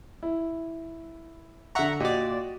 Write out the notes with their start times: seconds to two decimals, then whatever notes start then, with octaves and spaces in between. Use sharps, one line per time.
0.23 E4
1.75 D3 E5 F#5 A#5 C#6
2.00 A#2 F#4 G4 D5 D#5